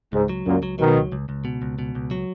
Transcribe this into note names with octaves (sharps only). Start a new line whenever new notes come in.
C#2 G#2
F#3
C#2 F#2 A#2
F#3
B2 D#3 F#3
C#2
C#2
C#2
B2
C#2
B2
C#2
F#3